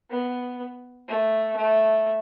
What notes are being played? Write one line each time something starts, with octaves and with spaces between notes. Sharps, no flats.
B3
A3
A3